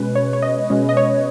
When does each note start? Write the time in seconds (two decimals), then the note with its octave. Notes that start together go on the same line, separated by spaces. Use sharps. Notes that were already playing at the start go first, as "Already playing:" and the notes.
Already playing: B2 G#3 C#4 B4
0.15 C#5
0.33 C#5
0.42 D#5
0.70 B2 G#3 C#4
0.89 D#5
0.97 C#5